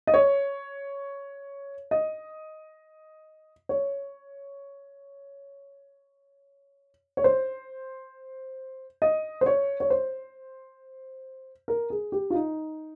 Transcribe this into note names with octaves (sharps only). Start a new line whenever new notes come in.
D#5
C#5
D#5
C#5
C#5
C5
D#5
C5
C#5
C#5
C5
A#4
G#4
G4
F4
D#4